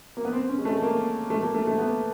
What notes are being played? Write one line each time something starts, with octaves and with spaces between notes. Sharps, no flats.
A#3
B3
C4
C#4
G#3
A3
A#3
A3
A#3
A3
A3
B3